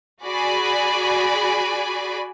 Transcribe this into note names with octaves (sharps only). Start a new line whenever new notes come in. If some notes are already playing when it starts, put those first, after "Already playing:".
F#4 G#4 D5 G#5 B5